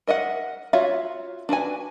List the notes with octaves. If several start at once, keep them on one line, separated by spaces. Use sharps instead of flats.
A#4 D#5 E5 F#5
F4 F#4 C#5 E5 F5
D4 F#4 B4 G#5